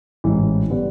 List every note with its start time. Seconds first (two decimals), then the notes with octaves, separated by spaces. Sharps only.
0.24 A1 G#2 E3
0.70 D3 G3 B3